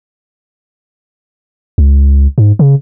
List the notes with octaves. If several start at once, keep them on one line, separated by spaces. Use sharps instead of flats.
C#2
G#2
C#3